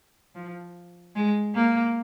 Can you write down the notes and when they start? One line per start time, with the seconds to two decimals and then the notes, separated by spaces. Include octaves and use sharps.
0.35 F3
1.15 G#3
1.55 A#3